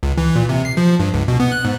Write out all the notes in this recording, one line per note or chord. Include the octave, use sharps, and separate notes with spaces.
C#2
E3
A#2
C3
C7
F3
G2
C#2
B2
B3
F#6
G#2